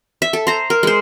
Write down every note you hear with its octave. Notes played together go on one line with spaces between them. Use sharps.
E5
A4
C5 A#5
A#4
G#3 C5